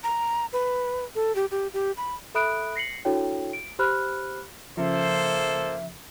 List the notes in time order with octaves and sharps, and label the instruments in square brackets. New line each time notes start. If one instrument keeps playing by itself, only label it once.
[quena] A#5
B4
A4
G4
G4
G4
B5
[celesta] A4 E5 B5 D#6 F#6 D7
A#6 C7 C#7 F#7
D4 E4 F#4 A4 C#5 G5
D7
G4 C5 B5 F6 F#6
[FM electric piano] C#3 F3 [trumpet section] A#3 A4 C5 [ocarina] E5